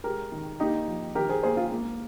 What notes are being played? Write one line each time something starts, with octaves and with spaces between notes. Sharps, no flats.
G#3 G4 A#4
D#3
A#3 D#4 G4
F3
D#3 G4 A#4
G#4 C5
A#3 G#4 C5
F4 G#4
G#3 A#3